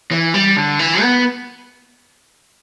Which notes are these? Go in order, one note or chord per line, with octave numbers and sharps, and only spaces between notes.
E3
G3
D3
E3
B3